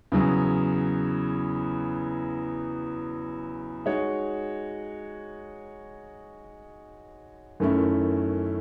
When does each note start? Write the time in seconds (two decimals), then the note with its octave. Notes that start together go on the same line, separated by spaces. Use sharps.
0.12 E2 C#3 F#3
3.86 G#3 D#4 F#4 C#5
7.60 F#2 D#3 A3 C#4 E4